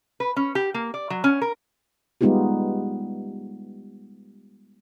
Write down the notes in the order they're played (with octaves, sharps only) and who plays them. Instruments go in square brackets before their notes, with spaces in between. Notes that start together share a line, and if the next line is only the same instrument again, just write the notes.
[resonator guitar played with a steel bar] B4
C#4
G4
A#3
D5
F#3
C#4
A#4
[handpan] G3 G#3 B3 D#4 F4 G4